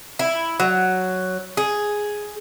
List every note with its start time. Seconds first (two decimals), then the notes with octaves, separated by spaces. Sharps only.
0.19 E4
0.60 F#3
1.57 G#4